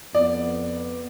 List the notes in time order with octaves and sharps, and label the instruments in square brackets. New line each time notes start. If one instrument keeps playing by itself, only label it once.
[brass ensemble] F2 B3 [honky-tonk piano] D5